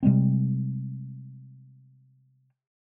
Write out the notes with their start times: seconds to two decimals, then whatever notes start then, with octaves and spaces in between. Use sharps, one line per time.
0.03 C3 G3 G#3 C4